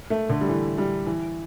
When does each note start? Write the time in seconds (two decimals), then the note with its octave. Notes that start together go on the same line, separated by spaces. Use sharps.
0.10 A3
0.29 D3
0.41 G3
0.49 E3
0.78 G3
1.06 E3